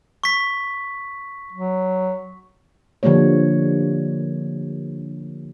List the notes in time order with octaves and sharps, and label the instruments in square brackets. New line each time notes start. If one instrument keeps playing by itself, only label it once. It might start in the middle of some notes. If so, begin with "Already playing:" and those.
[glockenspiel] C#6 B6
[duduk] F#3
[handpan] D3 F3 G3 A#3 C#5